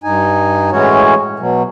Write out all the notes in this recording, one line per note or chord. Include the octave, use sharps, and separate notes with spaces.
G2 D#4 G#5
A2 E3 G#3 C#4 F#4 C#5
B2 F#3